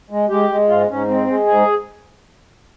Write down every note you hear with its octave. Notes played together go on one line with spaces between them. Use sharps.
G#3
G#3 G4
G#3
G#2 F4
G#2 C#4
G#3 C4
G#3
G#2 G#4